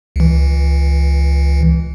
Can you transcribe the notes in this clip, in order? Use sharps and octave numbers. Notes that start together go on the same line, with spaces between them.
C#2 E3